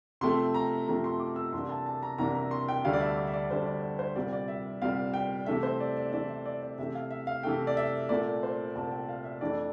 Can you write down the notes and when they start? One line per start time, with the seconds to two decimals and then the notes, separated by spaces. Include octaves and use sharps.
0.21 C3 F3 A3 C4 C6
0.54 A#5
0.88 C3 F3 A3 C4 A#5
1.04 C6
1.20 D6
1.36 E6
1.53 C2 C3 E3 A#3 D4 C6
1.69 A5
1.86 A5
2.03 A#5
2.18 C2 C3 E3 A#3 D4 A#5
2.35 A#5
2.51 C6
2.68 G5
2.84 D2 D3 G3 D4 F5
2.93 D5
3.01 E5
3.17 D5
3.27 E5
3.34 D5
3.50 D2 D3 G3 D4 C5
3.66 D5
3.82 D5
3.99 C5
4.16 C2 A#2 G3 C4 D5
4.33 D5
4.48 E5
4.82 C2 A#2 G3 C4 F5
5.14 G5
5.46 C3 E3 A3 E5
5.63 C5
5.80 D5
5.97 D5
6.12 C3 E3 A3 D5
6.29 E5
6.46 D5
6.62 D5
6.78 C3 E3 A3 E5
6.95 F5
7.11 E5
7.27 F5
7.43 C3 E3 A3 G5
7.67 D5
7.77 E5
8.09 C2 A#2 A3 D5
8.43 C5
8.76 C2 A#2 A3 A5
8.91 G5
9.09 F5
9.24 E5
9.41 F2 E3 A3 D4 D5